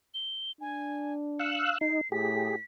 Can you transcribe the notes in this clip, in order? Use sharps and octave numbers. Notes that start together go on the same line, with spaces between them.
G7
D4 G#5
F5 E6 F#6 C#7
D#4 C7
A2 G4 G#4 B6